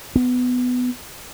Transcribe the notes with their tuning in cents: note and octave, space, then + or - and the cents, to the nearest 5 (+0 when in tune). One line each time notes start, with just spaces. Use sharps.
B3 +15